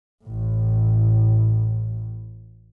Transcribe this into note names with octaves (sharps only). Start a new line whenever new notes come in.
A1 A2